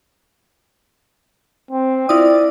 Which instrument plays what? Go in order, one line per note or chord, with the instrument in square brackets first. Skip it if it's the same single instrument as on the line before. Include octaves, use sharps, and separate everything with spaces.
[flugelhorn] C4
[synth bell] E4 F4 D#6 [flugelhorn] D5